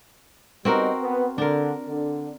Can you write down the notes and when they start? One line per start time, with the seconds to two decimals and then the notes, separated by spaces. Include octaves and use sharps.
0.65 G3 B3 C4 D#4 F#4 A#4
1.02 B3
1.38 D3 D4 A#4
1.87 D3